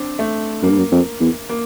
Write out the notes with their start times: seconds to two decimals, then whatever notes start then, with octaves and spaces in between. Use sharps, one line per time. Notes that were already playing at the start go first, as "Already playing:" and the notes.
Already playing: C4 D4
0.19 A3
0.63 F#2 A#3
0.70 G2
0.78 F#2
0.92 F2
1.21 E2
1.49 A#3